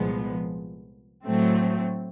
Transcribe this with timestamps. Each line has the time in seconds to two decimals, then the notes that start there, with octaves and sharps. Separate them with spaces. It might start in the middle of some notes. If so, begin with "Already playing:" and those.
Already playing: C2 A#2 F3 G#3 B3
1.24 A2 F#3 A3 C4